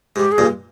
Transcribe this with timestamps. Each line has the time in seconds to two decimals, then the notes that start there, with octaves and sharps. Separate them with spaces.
0.16 G#2 G4
0.32 G#4
0.38 G2 A#2